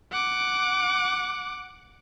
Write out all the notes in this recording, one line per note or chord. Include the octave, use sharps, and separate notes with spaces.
F#5 D6